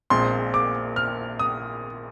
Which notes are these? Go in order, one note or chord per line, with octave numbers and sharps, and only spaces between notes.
A#1 A#2 G#3 C4 C6
D6
F6
D#6